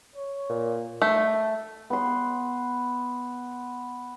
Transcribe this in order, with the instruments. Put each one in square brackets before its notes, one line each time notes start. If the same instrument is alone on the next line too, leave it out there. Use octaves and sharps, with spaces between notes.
[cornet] C#5
[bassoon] A#2
[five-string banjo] A3
[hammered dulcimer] B3 C6